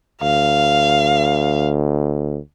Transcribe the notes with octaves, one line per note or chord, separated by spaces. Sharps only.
D2 F5